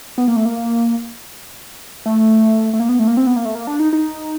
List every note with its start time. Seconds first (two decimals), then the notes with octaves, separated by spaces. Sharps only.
0.18 B3
0.28 A#3
0.36 A3
0.45 A#3
2.06 A3
2.73 A3
2.80 A#3
2.89 B3
2.99 A3
3.08 A#3
3.17 C4
3.26 B3
3.36 A#3
3.45 A3
3.55 A#3
3.67 D4
3.80 D#4
3.93 D#4